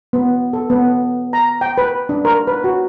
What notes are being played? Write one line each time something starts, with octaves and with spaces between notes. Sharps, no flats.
B3
A4
B3
A#5
G5
B4
D4
A#4
B4
F#4